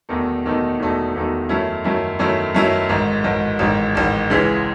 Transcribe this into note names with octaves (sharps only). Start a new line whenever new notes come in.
E1 E2 D#3 A3 D#4
E1 E2 D#3 A3 D#4
E1 E2 D#3 A3 D#4
E1 E2 D#3 A3 D#4
F#2 D#3 A3 C#4 E4
F#2 D#3 A3 C#4 E4
F#2 D#3 A3 C#4 E4
F#2 D#3 A3 C#4 E4
A1 G#2 D#3
A1 G#2 D#3
A1 G#2 D#3
A1 G#2 D#3
C#2 C#3 E3 G#3